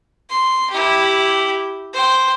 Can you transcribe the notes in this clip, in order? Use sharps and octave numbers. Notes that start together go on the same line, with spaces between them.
C6
E4 G4
C5 G5